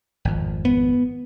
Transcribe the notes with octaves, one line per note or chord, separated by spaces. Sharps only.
G#1 F2
B3